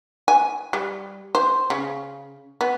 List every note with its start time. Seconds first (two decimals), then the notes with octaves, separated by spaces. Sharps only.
0.28 G#5
0.73 G3
1.35 C5
1.70 C#3
2.61 B3